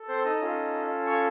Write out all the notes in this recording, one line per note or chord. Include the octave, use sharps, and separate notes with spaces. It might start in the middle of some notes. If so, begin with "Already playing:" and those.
Already playing: A4
C4 C5
D#4 D#5
C#4 F4 A4
C#5 C#6